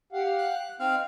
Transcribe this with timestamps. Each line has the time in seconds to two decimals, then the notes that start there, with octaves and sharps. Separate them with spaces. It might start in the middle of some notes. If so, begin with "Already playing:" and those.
0.12 G4 F5 F#5
0.38 F#6
0.80 C4 D#4 F5